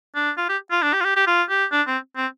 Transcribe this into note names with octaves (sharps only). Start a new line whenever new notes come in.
D4
F4
G4
F4
D4
G4
F4
G4
G4
F4
G4
D4
C4
C4